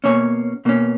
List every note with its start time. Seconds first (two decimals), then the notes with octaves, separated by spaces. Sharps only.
0.04 B2 A#3 C#4 C#5
0.65 B2 A#3 C#4